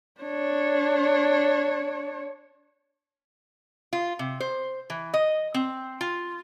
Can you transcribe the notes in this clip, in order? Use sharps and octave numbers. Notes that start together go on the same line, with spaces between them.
D4 C#5
F4
C3
C5
E3
D#5
C4
F4